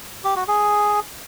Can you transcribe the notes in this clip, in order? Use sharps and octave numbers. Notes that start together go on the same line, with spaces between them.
G4
F#4
G#4